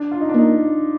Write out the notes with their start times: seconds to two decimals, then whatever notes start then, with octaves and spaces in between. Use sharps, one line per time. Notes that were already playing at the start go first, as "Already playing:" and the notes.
Already playing: D4
0.11 F4
0.21 D#4
0.29 D4
0.34 A#3 D#4